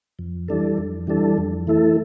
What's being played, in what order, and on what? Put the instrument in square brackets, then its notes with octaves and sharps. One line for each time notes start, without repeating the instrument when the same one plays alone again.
[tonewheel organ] F2
E3 G3 D4 A4
F2
E3 G3 D4 A4
F2
E3 A3 E4 A4